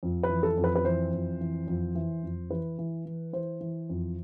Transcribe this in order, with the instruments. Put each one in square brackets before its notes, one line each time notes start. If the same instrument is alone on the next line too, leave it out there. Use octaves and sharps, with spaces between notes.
[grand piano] F2
B4
E3
A4
F2
B4
B4
E3 C5
F2
E3
F2
E3
F2
E3 B4
E3
E3
E3 C5
E3
F2